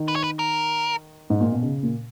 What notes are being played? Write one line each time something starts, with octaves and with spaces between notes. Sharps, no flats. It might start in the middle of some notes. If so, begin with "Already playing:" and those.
Already playing: D#3
B4
C#5
B4
A#4
G#2
A#2
B2
C#3
A#2